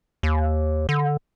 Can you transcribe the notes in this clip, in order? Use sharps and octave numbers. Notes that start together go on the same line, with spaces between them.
D#2
D3